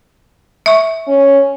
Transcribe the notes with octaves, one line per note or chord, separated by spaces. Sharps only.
E5 C#6
C#4